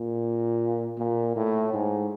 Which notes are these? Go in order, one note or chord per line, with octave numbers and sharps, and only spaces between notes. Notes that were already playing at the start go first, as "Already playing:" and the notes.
Already playing: A#2
A#2
A2
G#2